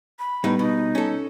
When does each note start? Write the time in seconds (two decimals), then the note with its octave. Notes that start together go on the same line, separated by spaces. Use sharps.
0.19 B5
0.44 A2 G3 B3 D#4
0.59 B2 D#4
0.95 C#4 A4